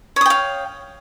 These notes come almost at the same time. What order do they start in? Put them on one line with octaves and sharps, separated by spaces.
C#5 D#6 G5 F5